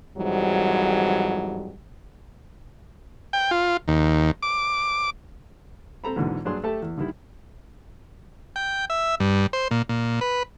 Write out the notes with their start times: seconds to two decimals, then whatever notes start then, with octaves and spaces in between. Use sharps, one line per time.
0.17 F2 G#2 E3 F#3 G3
3.33 G5
3.51 F4
3.88 D#2
4.43 D6
6.04 C4 A4 A#5 B5
6.16 E2 G#2 B2 D3
6.45 G2 F#3 D4 G#4 C6
6.63 A3 G4 A4 E5 A5
6.82 E2
6.98 D3 D#3 G3 E4
8.56 G5
8.90 E5
9.20 G2
9.53 C5
9.71 A#2
9.89 A#2
10.21 B4